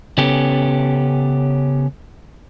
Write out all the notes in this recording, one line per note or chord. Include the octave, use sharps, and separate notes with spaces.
C#3 B3 C#4 G4 A4